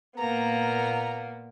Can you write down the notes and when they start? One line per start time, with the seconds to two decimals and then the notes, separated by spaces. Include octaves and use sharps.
0.17 A#2 A#3 B3 A#5